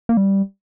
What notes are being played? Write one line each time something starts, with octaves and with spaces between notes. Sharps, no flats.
A#3
G3